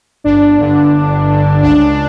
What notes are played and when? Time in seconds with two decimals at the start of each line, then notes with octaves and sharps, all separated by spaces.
0.24 G1 D4
0.60 G2 D3
0.93 G1
1.28 G2 D3
1.63 C#2 D4